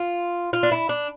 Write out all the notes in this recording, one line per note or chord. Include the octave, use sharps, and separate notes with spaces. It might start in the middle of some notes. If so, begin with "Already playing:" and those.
Already playing: F4
F4
D4
E4
D4